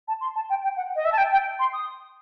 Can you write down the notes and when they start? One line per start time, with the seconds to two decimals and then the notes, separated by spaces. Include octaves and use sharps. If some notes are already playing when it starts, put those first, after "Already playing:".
0.07 A5
0.20 C6
0.35 A5
0.49 G5
0.63 G5
0.76 F#5
0.95 D#5
1.05 E5
1.12 A5
1.17 G5
1.31 G5
1.59 C6
1.73 D#6